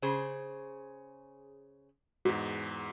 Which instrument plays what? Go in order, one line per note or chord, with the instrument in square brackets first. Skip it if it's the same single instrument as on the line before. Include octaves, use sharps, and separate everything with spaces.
[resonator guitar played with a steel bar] C#3 G#4 C5
[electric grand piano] E2 G#2 [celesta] F#4